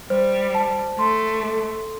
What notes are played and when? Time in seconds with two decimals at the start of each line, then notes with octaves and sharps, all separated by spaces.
0.10 G3 C5
0.55 A5
0.99 A3 C6
1.43 A4